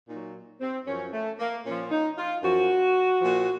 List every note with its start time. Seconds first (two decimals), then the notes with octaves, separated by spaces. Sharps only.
0.09 A#2 F#3 D#4
0.61 C4
0.87 F#2 F3 C#4
1.13 A3
1.39 A#3
1.65 A#2 F3 C#4
1.91 D#4
2.18 F4
2.43 F#2 F3 F#4
3.22 A#2 F3